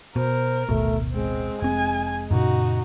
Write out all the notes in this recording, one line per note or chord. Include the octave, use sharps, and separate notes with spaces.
B2 A#4 C5
D1 G#1 B2 A3
G#3 C4
F1 C4 G#5
F#2 A#2 C#3 D#4 F#4